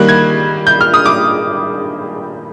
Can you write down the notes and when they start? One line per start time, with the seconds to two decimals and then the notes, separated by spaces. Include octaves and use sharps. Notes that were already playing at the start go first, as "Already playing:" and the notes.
Already playing: D#3 G3 A#3 F#6
0.09 G#6
0.67 G6
0.81 F6
0.94 D#6
1.06 D6